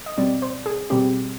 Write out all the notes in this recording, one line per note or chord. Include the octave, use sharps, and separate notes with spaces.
D#5
B2 G3 C4 D5
C5
G#4
B2 G3 C4 G4